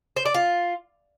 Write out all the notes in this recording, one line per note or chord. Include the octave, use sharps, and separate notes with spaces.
C5
D5
F4